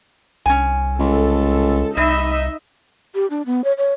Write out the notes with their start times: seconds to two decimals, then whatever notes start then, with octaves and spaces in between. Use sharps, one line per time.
0.46 C2 C#4 G#5
0.99 C#2 A4
1.97 C2 G3 D#4 D#5 E5
3.15 G4
3.30 D4
3.46 B3
3.64 C#5
3.78 C#5